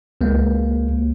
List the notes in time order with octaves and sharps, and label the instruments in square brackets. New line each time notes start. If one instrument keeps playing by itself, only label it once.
[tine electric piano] C#2 G#3 A#3